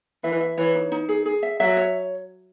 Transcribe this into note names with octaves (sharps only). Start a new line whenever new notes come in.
E3 E5
E5
E3 C#5
D#4
D#4
G#4
G#4
E5
F#3 E5
C#5